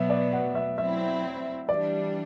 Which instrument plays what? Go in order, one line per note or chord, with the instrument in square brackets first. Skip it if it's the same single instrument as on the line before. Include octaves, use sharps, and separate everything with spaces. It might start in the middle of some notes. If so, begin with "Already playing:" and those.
Already playing: [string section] B2 F#3 B3 [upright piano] E5
[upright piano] D5
F#5
E5
[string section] F#3 C4 E4 [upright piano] E5
[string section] E3 G3 D4 [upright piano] D5